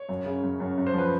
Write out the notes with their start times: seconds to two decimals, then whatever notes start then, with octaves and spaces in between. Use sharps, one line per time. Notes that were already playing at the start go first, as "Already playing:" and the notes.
Already playing: C#5
0.09 F#2
0.25 C#3
0.43 F#2
0.60 F#2
0.78 F#2
0.87 C5
0.94 F3 B4